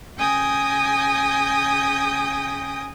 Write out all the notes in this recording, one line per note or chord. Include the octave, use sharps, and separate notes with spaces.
C#3 G5 G#5 D#6 G6 A#6